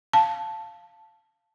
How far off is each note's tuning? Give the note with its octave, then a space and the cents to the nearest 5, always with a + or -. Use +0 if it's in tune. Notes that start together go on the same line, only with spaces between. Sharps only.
F5 +0 A5 +0